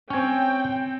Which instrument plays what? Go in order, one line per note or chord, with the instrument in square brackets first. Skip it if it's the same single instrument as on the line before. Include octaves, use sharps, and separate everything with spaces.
[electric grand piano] C4 C#5 [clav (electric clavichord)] C#4 G#5 [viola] G5